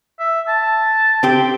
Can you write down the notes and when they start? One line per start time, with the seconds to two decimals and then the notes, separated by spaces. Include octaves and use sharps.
0.19 E5
0.48 A5
1.23 C4 G4